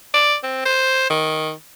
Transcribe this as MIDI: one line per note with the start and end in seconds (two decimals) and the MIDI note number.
0.14 0.36 74
0.43 0.60 60
0.65 1.10 72
1.10 1.51 51